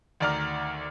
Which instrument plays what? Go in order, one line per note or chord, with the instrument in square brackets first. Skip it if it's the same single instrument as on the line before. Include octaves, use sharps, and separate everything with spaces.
[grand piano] D2 D#3 D5 A#5 F6